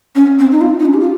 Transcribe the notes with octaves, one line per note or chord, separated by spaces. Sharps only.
C#4
C4
D#4
F4
D#4
C#4
G4
F4